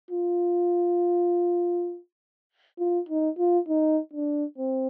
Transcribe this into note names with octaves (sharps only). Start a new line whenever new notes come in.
F4
F4
D#4
F4
D#4
D4
C4